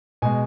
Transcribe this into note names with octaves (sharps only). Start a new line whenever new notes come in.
B2 G#3 G#5